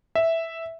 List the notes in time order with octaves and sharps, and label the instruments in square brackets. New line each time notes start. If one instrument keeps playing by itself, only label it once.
[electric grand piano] E5